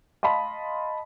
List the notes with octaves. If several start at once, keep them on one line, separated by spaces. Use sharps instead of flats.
D#5 F5 A5 B5 C6